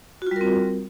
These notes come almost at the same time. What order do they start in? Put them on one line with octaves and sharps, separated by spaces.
F#4 F4 G3 A#4 C4